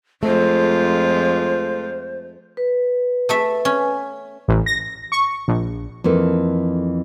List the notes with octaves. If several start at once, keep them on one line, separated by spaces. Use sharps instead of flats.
F2 G#3 A3 F4 C5
B4
A3 A4 E5
C#4
A1
A#6
C#6
A#1
F2 E3 A#3 A4